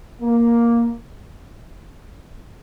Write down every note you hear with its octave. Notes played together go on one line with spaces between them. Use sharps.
A#3